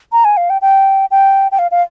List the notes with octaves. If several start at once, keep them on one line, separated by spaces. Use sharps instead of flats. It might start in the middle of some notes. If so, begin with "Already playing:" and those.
A#5
G#5
F5
G5
G5
G5
G5
F5
F5